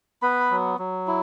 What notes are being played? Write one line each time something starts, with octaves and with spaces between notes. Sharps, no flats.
B3 B4 B5
F#3
F#3
E4